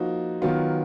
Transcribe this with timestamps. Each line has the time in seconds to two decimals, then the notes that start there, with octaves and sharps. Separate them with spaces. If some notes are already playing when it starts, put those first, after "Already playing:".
Already playing: F3 A#3 D#4 F#4
0.42 D#3 F#3 B3 F4